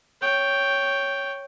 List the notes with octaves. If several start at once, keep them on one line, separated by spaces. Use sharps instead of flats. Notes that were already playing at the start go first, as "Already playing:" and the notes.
C#5 G5